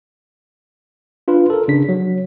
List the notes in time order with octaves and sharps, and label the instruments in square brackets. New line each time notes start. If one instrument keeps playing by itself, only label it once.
[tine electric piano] D4 F4 B4
A4 A#4
C#3 D4 B6
F#3